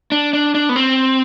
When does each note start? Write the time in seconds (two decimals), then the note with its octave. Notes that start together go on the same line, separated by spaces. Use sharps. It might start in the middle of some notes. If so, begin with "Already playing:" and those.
0.12 D4
0.33 D4
0.55 D4
0.69 B3
0.76 C4